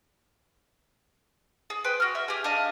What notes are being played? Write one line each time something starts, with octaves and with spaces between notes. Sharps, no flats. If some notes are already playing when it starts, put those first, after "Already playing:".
G#4
B4 G5 C6
F#4 F6
E5
G4 G#4
D4 G#4 D#5 F5